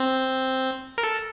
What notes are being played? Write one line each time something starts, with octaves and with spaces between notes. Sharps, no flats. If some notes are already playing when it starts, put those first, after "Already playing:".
Already playing: C4
A#4
A4